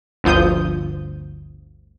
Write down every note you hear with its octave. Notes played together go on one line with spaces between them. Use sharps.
G1 D2 F3 D#6 G6